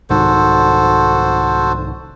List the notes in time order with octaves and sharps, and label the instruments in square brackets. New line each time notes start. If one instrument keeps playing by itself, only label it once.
[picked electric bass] C2 G#2 D#3 [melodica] F#4 A4 C5